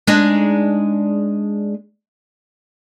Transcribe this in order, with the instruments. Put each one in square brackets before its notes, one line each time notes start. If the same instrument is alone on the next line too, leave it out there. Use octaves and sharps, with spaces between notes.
[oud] G#3 D4 D#4